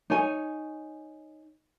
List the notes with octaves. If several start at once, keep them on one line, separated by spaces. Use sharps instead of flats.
D#4 C#5 G#5